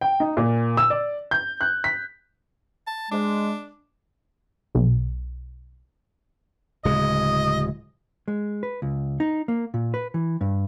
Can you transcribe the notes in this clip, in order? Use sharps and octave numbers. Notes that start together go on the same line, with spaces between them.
G5
D#4
A#2
E6
D5
G6
F#6
B6
A5
G#3 D4
B1
D1 C#3 G#3 D#5
G#3
B4
C#2
D#4
A#3
A#2
B4
E3
G2